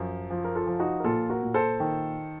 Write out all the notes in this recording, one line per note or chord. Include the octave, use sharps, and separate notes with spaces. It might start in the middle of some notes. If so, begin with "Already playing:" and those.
Already playing: F#2 F3
F3
A#4
F4 A4
F3
D#4 F#4
A#4
A#2 F4 A4
F#4 A#4
A#2
A4 C5
D#3